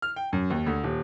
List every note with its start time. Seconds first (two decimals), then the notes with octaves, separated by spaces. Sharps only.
0.02 F6
0.16 G5
0.33 F#2
0.50 D#2
0.66 D2
0.84 D#1